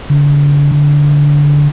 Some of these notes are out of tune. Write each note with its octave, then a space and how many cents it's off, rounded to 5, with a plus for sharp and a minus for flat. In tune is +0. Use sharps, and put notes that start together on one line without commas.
D3 -35
D3 -15